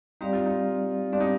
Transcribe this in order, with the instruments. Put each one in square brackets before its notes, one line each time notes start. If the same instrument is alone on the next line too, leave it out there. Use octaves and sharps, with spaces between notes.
[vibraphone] G3 C4 G4 D5 F5 [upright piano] D#4
[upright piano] F4
D#4
[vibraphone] G3 C4 G4 D5 F5 [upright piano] D4
[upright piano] D#4